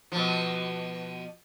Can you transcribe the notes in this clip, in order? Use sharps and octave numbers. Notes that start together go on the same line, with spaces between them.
B2 F3